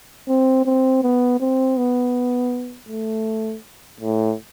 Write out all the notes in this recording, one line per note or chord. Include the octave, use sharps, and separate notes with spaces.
C4
C4
B3
C4
B3
A3
A2